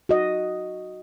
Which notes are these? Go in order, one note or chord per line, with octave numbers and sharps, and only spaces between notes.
F#4 D#5